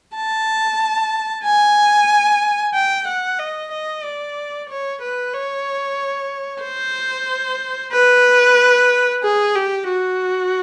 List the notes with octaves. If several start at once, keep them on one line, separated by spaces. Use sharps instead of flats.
A5
G#5
G5
F#5
D#5
D#5
D5
C#5
B4
C#5
C5
B4
G#4
G4
F#4